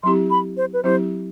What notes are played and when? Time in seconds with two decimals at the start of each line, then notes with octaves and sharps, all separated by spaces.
0.03 F#3 C4 E4 G4 C6
0.30 B5
0.57 C5
0.73 B4
0.83 F#3 C4 E4 G4 C5